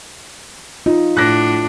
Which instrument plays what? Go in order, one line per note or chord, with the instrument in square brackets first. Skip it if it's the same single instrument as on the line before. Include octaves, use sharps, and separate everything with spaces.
[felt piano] D#4 [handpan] F4
[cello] A2 D4 [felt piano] F#6 A#6